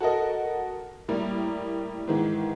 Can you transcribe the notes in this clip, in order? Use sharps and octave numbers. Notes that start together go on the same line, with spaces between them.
F#4 A4 A#4 D#5
A2 G3 A#3
G#2 D#3 E3